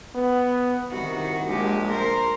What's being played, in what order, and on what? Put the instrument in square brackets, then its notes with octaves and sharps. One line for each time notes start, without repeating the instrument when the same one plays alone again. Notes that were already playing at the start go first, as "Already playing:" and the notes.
[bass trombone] B3
[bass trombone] C2 [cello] D#3 F#4
[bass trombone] A#1 [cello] G#3 G4
[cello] A#4 C5